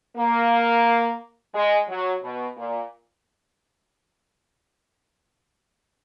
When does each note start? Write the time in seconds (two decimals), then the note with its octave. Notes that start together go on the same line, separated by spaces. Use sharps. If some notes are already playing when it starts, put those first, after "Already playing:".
0.17 A#3
1.55 G#3
1.89 F#3
2.23 B2
2.57 A#2